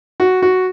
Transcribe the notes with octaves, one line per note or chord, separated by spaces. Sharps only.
F#4
F#4